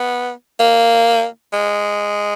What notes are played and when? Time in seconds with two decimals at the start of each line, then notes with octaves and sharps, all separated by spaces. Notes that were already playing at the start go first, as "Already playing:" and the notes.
Already playing: B3
0.59 A#3
1.53 G#3